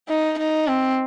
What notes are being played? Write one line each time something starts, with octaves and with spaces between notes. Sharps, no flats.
D#4
D#4
C4